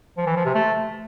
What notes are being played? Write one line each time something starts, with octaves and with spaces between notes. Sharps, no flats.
F3
E3
F3
C3
A3